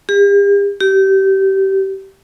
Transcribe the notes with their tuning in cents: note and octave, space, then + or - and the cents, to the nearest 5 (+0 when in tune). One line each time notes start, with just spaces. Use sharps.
G4 +45
G4 -25